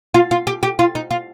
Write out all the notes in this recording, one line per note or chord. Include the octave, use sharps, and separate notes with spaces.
F4
F4
G4
G4
F4
D#4
F4